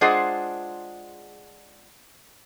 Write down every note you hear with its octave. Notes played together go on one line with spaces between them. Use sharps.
G#3 D4 F4 G#4 C5 F#5